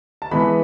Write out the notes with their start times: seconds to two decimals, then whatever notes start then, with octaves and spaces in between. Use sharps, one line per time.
0.22 A5
0.31 E3 G#3 B3 B5